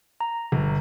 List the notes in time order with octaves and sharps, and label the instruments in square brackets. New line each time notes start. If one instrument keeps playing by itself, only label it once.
[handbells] A#5
[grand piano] G1